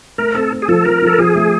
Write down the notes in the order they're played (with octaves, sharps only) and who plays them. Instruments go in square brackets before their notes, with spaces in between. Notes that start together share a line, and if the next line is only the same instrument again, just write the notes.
[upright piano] A3 [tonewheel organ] A#4
[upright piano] C4 [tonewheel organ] A4
[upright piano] C4
[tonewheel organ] G#4
[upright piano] F3 [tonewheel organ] A4
[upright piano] F3 [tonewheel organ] A#4
[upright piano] F3 [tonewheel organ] A4
[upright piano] F3 [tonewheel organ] G#4
[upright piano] A3